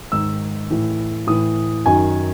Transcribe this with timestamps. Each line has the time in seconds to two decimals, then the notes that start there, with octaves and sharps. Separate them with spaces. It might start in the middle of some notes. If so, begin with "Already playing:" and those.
0.12 G#2 D#3 E6
0.70 A2 E3
1.27 A2 E3 D#6
1.86 F#2 D#3 G#5